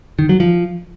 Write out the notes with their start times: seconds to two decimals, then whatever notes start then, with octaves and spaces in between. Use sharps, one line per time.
0.19 D#3
0.29 F#3
0.40 F3